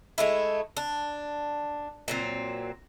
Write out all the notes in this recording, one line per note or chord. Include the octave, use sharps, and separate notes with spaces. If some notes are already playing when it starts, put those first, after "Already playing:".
G#3 A3 E4
D4
A#2 F#3 C4